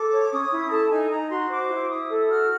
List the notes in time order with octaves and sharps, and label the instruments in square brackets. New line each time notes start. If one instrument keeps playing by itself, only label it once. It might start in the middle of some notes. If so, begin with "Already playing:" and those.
Already playing: [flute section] A4 D6
C#5
C#4 D#6
E4
A#5
A4 A5
D#4 G#5
D#4 A#5
F#4 C6
C5 D6
E4
E4 D#6
A4
F#4 F6